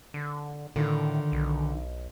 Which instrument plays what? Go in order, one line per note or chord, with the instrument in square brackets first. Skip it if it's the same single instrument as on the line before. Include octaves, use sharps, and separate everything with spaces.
[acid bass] D3
[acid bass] A2 [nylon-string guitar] D3 D#3 F4
[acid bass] B1